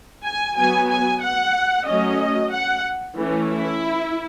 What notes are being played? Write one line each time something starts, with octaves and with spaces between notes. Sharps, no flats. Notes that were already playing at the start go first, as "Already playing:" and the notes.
G#5
F#3 B3 G#5
G#5
F#5
F#3 A3 C#4 D#5
F#5
E3 A3 C#4
E4